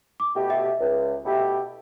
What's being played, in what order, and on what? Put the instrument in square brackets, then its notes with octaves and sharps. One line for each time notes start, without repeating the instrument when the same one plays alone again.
[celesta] D6
[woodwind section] B2 A3 E4 G4
[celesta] E5
[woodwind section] C#2
B2 A3 E4 G4